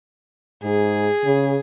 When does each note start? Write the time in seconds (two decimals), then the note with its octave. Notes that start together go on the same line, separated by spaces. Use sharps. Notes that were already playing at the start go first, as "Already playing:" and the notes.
0.64 G#2 G#4
1.25 C#3